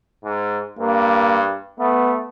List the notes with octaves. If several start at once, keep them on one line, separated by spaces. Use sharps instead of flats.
G#2
G2 A#3
A3 B3